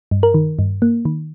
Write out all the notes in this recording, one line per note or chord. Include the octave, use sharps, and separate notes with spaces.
G2
A#4
D#3
G2
A#3
D#3